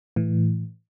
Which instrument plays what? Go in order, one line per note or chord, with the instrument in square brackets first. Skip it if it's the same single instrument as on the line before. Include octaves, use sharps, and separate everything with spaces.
[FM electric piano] A2 E3